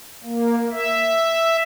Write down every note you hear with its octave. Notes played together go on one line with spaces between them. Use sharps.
A#3
E5